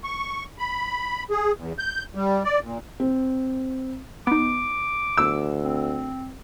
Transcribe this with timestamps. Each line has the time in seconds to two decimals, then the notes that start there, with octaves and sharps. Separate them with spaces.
0.04 C#6
0.58 B5
1.31 G#4
1.57 E2
1.79 G6
2.15 G3
2.45 D5
2.62 A#2
3.00 C4
4.27 B3 D#4 D6
5.17 D2 E6
5.64 C4